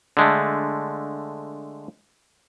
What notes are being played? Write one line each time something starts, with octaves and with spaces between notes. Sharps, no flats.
D3 G#3 A3